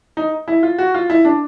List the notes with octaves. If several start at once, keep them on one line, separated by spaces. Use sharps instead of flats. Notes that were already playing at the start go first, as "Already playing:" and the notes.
D#4
E4
F4
F#4
F4
E4
D4